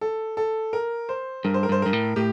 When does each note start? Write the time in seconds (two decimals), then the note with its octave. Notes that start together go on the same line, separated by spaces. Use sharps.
0.01 A4
0.37 A4
0.73 A#4
1.09 C5
1.44 G2 A#4
1.54 C5
1.63 A#4
1.69 G2 C5
1.82 G2 A#4
1.93 A2
2.16 A2 G4